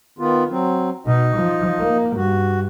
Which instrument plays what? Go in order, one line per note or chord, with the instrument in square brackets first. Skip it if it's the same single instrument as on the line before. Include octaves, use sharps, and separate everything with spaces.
[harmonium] D#3 B3 F4
F#3 C4
[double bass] B2 [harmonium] D#4 D#5
[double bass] F3
A#3
[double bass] G2 [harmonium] F#4